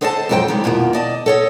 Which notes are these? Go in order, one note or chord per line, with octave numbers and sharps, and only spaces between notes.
G#4 A4 C5 D#5 E5 A5
F2 G#2 F#3 G4 C5 G5
D#3 G3 G#3
F2 B2 F3 A#3
D5 D#5 A5
A4 C#5 D#5